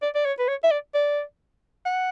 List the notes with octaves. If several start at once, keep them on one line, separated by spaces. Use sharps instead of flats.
D5
D5
C#5
B4
C#5
E5
D5
D5
F#5